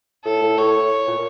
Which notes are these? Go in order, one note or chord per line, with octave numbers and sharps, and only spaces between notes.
A2 A4
A2
A2 C#5
A#2